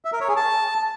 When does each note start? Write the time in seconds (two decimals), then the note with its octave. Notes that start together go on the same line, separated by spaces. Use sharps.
0.05 E5
0.13 A#4
0.21 C#5
0.28 G#4
0.36 A5